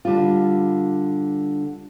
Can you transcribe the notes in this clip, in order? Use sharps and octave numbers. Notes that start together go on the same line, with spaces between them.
D3 G3 F4